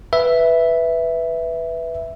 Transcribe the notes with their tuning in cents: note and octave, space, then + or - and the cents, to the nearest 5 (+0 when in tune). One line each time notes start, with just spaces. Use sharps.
B4 +0 E5 +0